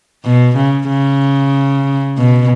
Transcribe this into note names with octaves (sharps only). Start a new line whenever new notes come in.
B2
C#3
C#3
B2